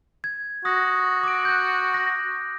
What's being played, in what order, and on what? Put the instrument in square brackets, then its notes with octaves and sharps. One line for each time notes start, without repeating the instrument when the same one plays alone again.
[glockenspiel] G#6
[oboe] F#4 [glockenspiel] D#6 A#6
[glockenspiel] D6 D7
F#6 G6
A#6